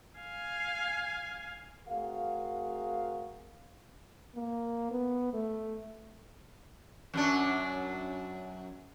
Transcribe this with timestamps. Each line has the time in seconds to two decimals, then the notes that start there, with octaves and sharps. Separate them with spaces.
0.20 F5 G#5
1.89 A3 C4 F#4 G#4 A#4 F5
4.35 A#3
4.91 B3
5.33 A3
7.14 F#2 F#3 D4